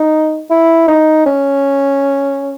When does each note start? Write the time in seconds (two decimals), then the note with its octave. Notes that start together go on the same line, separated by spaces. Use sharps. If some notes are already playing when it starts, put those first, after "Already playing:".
Already playing: D#4
0.50 E4
0.88 D#4
1.26 C#4